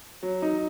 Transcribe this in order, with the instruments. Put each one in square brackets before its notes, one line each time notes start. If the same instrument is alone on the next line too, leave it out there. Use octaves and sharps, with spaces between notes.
[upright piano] F#3
D#4